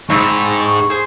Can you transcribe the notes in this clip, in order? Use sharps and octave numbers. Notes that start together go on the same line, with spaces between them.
G#2 C4 D#4 E4 C#6
G#4 C5